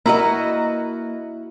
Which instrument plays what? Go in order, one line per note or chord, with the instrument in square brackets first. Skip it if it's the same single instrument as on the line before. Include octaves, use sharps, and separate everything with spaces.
[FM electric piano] A#3 [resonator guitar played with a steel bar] E4 F#4 D#5 [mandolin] B4 A#5